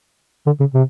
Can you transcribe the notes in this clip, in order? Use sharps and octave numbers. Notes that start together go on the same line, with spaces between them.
D3
C#3
C3